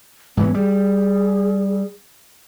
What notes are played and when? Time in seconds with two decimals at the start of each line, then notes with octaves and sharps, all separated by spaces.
0.37 G#2 E3 F#3 B3
0.54 G3 G#4